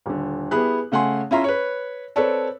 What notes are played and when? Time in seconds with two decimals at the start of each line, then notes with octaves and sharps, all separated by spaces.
0.06 D#1 D3
0.51 B3 E4 G4 G#4 F#6
0.92 C#3 A3 F#5 G#5 C6
1.31 C#4 E4 F4 E5 A#5 C6
1.44 B4 C#5
2.16 C4 A4 B4 C#5 D5 A5